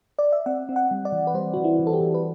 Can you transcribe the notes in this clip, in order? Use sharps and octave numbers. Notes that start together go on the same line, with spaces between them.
D5
E5
C4 F#5
C4
F#5
G3
D5
E3
B4
G3 C5
E3 F#4
E4
E3
A4
G4
E3
B4